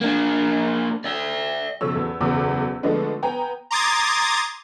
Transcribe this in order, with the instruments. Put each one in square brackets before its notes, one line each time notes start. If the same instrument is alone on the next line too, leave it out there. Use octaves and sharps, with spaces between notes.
[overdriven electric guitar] A#3 D4
D5 E5
[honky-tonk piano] F#1 B1 F3 A4 C#5 E6
E2
F#1 B1 E2 D6 E6
D3 F3 G#3 A3 B3 D4
B3 G5 G#5 A#5
[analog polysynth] A#5 C6 D6 D#6 G#6 A6